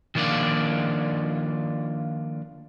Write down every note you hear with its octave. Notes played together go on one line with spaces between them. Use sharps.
D#3 F3 A#3 D4 F4 D5